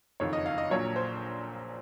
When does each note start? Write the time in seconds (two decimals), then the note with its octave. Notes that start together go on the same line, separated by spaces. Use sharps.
0.20 F#1 F2 D#3 C#5
0.33 D#5
0.46 F5
0.58 D#5
0.70 A#1 A#2 F#3 C#5
0.96 C5